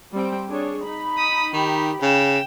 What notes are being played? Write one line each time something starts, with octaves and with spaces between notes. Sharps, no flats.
G3 C4 G5
D4 G#4 C#5
D#4 B5
D#6 B6
D#3 G4
C#3 G5 E7